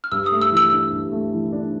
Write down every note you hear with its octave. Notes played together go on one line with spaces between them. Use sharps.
F6
G2 E6
D#6
A3
E6
E3
E6
D4
G2
A3
E3
D4